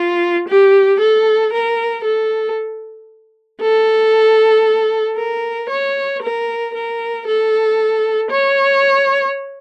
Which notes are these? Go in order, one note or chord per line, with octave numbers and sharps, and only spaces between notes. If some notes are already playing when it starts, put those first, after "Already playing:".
Already playing: F4
G4
A4
A#4
A4
A4
A#4
C#5
A#4
A#4
A4
C#5